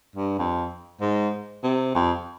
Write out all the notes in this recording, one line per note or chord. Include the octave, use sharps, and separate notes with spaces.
G2
F2
G#2
C3
F2